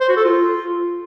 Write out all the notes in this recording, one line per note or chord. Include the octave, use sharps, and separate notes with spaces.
C5
F#4
A4
F4